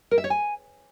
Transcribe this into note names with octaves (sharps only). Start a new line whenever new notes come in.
A#4
E5
C#5
G#5